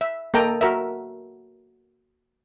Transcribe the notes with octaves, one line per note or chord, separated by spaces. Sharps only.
E5
A#3 A4 D#5 G5 A#5
F#4 A#4 E5